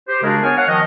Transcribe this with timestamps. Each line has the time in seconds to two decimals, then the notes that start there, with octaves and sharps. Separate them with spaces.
0.07 G4 C5
0.22 C#3 G#3 D4 F#4 G#4 A#4
0.42 B3 A#4 C#5 G#5
0.57 C#5 F5 F#5
0.68 D#3 F3 D#5